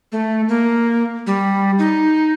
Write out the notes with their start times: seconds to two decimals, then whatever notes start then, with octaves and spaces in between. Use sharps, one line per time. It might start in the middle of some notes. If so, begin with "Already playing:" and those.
0.12 A3
0.48 A#3
1.27 G3
1.79 D#4